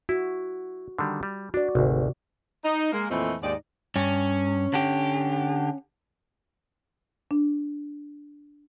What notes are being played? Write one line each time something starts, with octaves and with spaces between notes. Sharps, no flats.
E4 F#4
D3 D#3 G3
G3
D4 F#4 D5
G#1 D2 C3
D#4
G#3 A#3
F2 A#2 E3 A3 C4 D#5
D#2 G#2 D#4 G4 D5
G2 C#4
D3 G4
D4